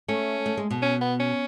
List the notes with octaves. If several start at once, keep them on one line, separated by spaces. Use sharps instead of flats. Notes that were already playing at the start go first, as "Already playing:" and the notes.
A3 C#4
A3
G#3
B2
C#4
B3
C#4